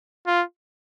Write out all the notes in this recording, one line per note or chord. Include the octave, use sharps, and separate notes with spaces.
F4